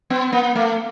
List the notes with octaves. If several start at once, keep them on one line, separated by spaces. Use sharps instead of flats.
B3
A#3
A3